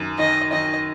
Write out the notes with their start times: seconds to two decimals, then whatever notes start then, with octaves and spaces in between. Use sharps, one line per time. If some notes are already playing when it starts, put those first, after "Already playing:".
Already playing: F#2 D#3
0.19 D#3 D#5
0.52 D#3 D#5